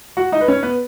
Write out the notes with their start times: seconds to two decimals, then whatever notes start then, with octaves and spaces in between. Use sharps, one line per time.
0.17 F#4 F#5
0.32 D#4 D#5
0.41 B4
0.48 C#4 C#5
0.63 B3 B4